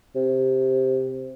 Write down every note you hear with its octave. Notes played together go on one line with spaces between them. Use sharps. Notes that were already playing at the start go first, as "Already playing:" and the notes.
C3